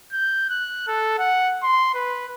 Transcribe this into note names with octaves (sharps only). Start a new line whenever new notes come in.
G6
F#6
A4
F#5
C6
B4